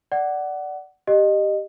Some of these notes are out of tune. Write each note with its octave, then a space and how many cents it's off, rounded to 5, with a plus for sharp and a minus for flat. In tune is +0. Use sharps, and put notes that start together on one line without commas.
D5 +0 F#5 +15
G4 +0 D#5 -20